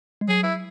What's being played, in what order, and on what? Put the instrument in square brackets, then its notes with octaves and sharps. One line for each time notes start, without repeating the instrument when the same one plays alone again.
[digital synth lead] G#3
[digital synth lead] F#3 [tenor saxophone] G#4
[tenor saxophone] E4